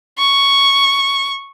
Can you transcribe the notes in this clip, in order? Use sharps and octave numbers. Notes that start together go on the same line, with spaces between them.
C#6